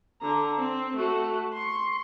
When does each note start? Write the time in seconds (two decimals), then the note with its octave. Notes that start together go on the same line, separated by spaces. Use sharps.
0.21 D3 A#5
0.58 C4
0.96 A3 F#4
1.54 C6 C#6